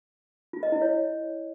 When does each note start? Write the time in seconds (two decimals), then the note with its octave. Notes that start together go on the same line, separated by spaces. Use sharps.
0.53 F4
0.63 D#5
0.72 E4
0.82 C#5